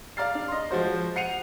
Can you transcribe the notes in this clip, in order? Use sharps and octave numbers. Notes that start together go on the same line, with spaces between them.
D5 F5 A#5 F6 A6 C7
D4
D#5 C6
F3 G#3 F#4 C5
F#5 C7 C#7 D#7 F7